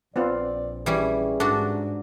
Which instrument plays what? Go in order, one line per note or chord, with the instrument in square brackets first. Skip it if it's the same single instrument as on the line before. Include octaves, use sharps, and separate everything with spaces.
[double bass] A#1 [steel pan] B3 C4 F4 [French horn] D5
[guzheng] E3 G3 C#4 [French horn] G#4
[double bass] G#2 [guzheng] D4 F#4 [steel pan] A4